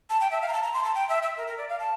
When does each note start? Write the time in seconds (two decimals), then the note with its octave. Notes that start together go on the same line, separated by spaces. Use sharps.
0.10 A5
0.21 G5
0.31 E5
0.42 F5
0.48 A#5
0.53 A5
0.62 A#5
0.74 C6
0.84 A5
0.95 G5
1.09 E5
1.23 E5
1.37 A#4
1.47 A#4
1.58 D5
1.69 F5
1.80 A5